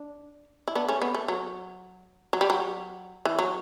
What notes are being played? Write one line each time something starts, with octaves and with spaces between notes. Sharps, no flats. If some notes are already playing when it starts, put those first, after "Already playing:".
Already playing: D4
E4
B3 D4
A3 C#4
B3
A3
F#3
F#3
G3
F#3
E3
F#3